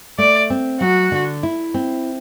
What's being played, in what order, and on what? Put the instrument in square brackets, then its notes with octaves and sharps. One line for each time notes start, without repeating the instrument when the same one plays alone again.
[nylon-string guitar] A3 [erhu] D5
[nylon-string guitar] C4
[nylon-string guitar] F#3 [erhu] F#4
[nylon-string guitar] D3
E4
C4